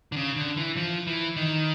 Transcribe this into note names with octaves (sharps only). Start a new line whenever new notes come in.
D3
C#3
D3
E3
F3
E3
D#3